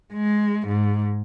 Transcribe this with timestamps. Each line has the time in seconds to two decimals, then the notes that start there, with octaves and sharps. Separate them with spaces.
0.14 G#3
0.68 G#2